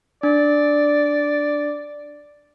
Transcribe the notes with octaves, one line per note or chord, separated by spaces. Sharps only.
D4 D5